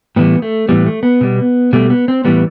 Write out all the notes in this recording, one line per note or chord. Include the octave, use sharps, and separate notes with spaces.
A2 E3 G3 B3
A3
A2 E3 G3 B3
A3
B3
B2 G3
B2 G3 A3
B3
C4
A2 E3 G3 B3